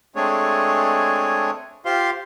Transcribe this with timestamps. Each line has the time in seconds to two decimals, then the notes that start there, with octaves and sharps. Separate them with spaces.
0.16 G#3 A3 C4 D4 G#4 C#5
1.85 F4 G4 C5 F5 C6